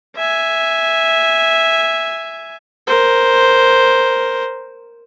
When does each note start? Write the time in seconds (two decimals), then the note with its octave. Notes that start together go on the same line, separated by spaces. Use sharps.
0.16 E5 G#5
2.87 A#4 C5